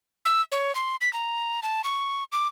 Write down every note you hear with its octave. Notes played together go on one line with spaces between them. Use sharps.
E6
C#5
C6
B6
A#5
A5
C#6
D6